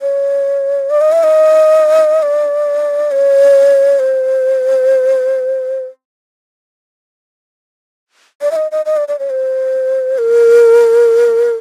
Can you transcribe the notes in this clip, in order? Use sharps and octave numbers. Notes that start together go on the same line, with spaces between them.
C#5
D5
D#5
E5
D#5
D5
C#5
C5
D5
E5
D#5
D#5
D#5
D5
D5
C#5
C5
A#4